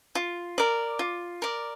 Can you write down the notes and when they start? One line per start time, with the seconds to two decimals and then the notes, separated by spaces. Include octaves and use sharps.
0.15 F4
0.58 A#4 D5
0.99 F4
1.42 A#4 D5